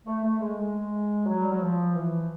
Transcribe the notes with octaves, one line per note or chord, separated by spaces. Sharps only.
A3
A3
G#3
G#3
F#3
G3
F#3
F3
E3